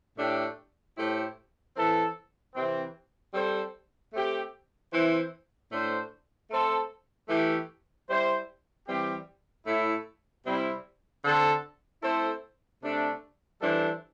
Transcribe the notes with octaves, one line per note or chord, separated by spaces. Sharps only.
A2 A3 D4 G4
A2 A3 E4 G4 C5
E3 C4 E4 A4
C3 E3 C4
G3 C4 A4 C5
A3 C4 G4
E3 C4 E4 C5
A2 A3 D4 C5
A3 C4 A4 C5
E3 A3 E4 G4
G3 E4 C5
E3 G3 C4 G4
A2 A3 E4
C3 G3 C4 E4
D3 C4 A4 C5
A3 C4 E4 A4 C5
C3 A3 D4
E3 G3 D4 A4 C5